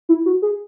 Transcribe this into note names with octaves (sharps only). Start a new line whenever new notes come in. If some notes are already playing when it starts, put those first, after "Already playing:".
E4
F#4
G#4